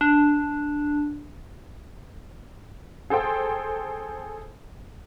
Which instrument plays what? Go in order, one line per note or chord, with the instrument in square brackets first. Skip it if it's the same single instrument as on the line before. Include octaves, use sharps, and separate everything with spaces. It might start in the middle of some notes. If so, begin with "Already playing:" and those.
[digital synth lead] D4
[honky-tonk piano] G#4 A4 C5 G5